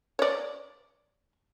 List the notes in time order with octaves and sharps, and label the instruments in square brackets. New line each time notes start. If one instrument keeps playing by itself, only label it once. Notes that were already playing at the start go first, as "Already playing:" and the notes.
[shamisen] C#5 D5